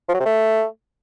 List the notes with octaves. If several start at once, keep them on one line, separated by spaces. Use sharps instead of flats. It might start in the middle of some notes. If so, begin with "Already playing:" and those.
F3
F#3
C3
A3